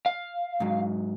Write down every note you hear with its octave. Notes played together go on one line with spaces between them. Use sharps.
F5
G#2 F#3